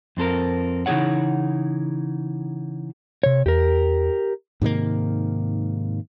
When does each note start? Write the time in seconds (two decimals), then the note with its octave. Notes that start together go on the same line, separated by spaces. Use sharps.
0.17 F2 C4 A4 A#4
0.86 C#3 E3 D#4 G#4 C#5 F#5
3.23 C3 C#5
3.46 E2 G4 A#4
4.62 G#2 C3 D#3 A#3